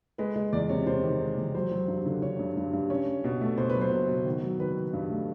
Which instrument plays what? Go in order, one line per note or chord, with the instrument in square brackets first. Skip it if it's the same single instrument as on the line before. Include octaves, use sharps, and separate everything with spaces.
[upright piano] G#3 B4
G#3
E2 D5
C3 C#5
C3 C5
D#3
G#3
E2
F#3 C5
F#3
G2
D3
D3 C#5
G2
G2
G2
C#4 C#5
C#4
B2
A3
B2 C5
B4
F#3
C5
B2
B2
D#3
F#3
D#3 B4
D#3
G2
A3